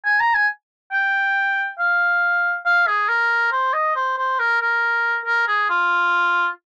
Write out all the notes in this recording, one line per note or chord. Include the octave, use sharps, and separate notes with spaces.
G#5
A#5
G#5
G5
F5
F5
G#4
A#4
C5
D#5
C5
C5
A#4
A#4
A#4
G#4
F4